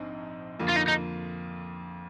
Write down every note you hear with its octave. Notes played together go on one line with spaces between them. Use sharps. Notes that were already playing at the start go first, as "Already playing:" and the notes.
Already playing: A#1 G#2 C4 D#4
F2 D3 F3 A#3
F4
D#4
D#4